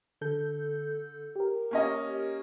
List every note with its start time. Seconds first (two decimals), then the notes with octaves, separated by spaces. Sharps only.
0.21 D3 A4 G6
1.36 G4 A#4
1.71 A#3 C#4 D#5